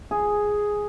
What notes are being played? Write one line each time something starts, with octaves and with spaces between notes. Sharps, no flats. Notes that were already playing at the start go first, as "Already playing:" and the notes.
G#4